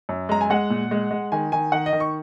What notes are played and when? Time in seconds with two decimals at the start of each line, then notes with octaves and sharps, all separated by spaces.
0.09 F#2
0.29 G#3 A#5
0.41 G#5
0.50 G#3 F#5
0.70 A#2
0.91 G#3
1.11 G#3
1.32 D#3 G#5
1.52 D#3 G#5
1.72 D#3 F#5
1.86 D#5
1.93 D#3
2.00 C#6